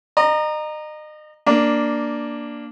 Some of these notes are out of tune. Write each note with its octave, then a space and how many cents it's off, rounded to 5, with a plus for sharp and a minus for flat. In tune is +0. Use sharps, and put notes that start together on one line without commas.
D#5 -35 A#5 +0
A#3 +0 D4 +0